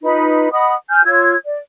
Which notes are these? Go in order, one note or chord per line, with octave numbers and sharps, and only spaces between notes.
D#4 F4 B4 B5
D#5 F#5 B5 D#6
G#5 F6 G6
F4 C#5 E6 G#6
D5